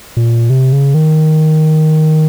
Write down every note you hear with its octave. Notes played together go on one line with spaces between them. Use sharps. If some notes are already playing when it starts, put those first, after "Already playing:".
A#2
C3
C#3
D#3